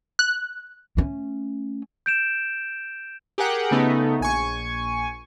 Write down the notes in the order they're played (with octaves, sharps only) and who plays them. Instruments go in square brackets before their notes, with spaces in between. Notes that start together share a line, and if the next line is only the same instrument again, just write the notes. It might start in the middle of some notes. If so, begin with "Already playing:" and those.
[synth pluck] F#6
[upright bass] A3 C#4
[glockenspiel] G6 D7 E7
[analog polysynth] G4 G#4 A#4 F#5 G5
C#3 A3 B3 D#4
A#1 G#5 C#6